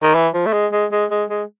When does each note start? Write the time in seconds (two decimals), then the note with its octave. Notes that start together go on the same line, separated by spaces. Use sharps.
0.03 D#3
0.15 E3
0.34 F3
0.46 A3
0.53 G#3
0.72 G#3
0.92 G#3
1.11 G#3
1.30 G#3